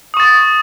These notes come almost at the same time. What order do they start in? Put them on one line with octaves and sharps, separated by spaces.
D#6 C#6 A6